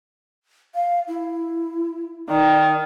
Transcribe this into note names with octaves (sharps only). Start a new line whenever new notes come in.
F5
E4
D#3 D5